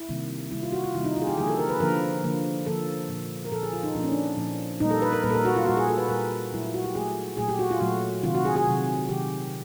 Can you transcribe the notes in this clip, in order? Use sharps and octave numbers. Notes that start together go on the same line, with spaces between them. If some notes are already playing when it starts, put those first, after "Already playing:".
Already playing: E4
C3 D#3 G3 A#3
C3 D#3 G3 A#3 E4
F4
F#4
F4
C3 D#3 G3 A#3 E4
D#4
F4
G#4
G4
D3 F3 A#3 G#4
A4
A#4
B4
D3 F3 A#3 A#4
D3 F3 A#3
D3 F3 A#3 A4
A#2 F3 A#3
A#4
A#2 F3 A#3 A4
G#4
F4
D#4
A#2 F3 A#3 D4
C#4
D4
A#2 F3 A#3
A#2 G3 A#3 D#4
A4
B4
A#4
A#2 G3 A#3 B4
A4
A#4
F#4
F4
A#2 G3 A#3 F#4
G#4
A4
B4
A#2 G3 A#3 A#4
A#2 F#3 A3 E4
F4
F#4
G4
A#2 F#3 A3 G#4
A#2 F#3 A3 G#4
G4
F#4
F4
A#2 F#3 A3 F#4
C3 D#3 F#3 F4
F#4
G#4
G#4
C3 D#3 F#3
C3 D#3 F#3 G4